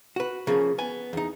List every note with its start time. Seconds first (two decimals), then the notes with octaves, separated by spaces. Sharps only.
0.16 F#4 B4
0.47 C#3 F3 A#3 C#4
0.78 B3 G#5
1.13 E2 D#4